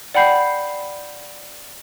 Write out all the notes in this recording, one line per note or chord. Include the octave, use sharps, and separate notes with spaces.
D5 F#5 G5 B5 G6 C7